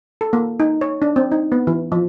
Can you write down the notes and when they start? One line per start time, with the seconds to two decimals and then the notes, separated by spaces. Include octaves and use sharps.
0.21 A4
0.33 A#3
0.60 D#4
0.81 C#5
1.02 D4
1.16 C4
1.32 D#4
1.52 B3
1.67 E3
1.92 F3